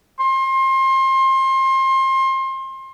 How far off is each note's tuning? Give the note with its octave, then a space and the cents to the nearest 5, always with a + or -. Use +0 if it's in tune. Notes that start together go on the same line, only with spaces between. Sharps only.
C6 +30